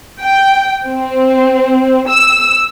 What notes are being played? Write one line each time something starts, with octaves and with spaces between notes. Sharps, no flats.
G5
C4
E6